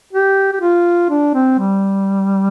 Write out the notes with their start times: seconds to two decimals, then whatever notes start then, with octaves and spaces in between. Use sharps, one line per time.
0.13 G4
0.52 G4
0.61 F4
1.10 D4
1.35 C4
1.59 G3